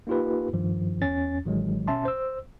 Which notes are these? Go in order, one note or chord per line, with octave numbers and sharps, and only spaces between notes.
A#3 D#4 F4 G4 B4
G2 D#3 F3
E2 C#4 A6
A1 D#3 F#3 G#3
B2 C#4 E5 A5 C6
C5 E6